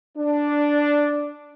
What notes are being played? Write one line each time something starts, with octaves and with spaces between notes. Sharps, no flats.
D4